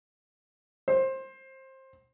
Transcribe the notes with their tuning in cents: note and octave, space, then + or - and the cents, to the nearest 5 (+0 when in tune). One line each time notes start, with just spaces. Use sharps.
C5 +20